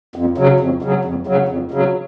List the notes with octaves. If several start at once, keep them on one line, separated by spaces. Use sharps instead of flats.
F2
C#3 F#3
F2
C#3 F#3
F2
C#3 F#3
F2
C#3 F#3